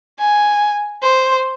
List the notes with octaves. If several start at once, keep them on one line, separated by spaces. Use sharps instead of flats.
G#5
C5